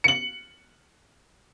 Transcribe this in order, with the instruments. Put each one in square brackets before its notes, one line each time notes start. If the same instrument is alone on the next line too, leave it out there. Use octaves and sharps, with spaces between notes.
[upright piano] C#7 F#7